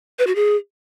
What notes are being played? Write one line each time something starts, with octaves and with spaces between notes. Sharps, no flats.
B4
F#4
G#4